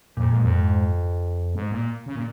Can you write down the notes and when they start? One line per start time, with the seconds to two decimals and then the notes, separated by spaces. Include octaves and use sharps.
0.17 F2 A#2
0.30 G#2
0.43 F2
0.52 G#2
1.55 G#2
1.72 A#2
2.06 C#3
2.16 A#2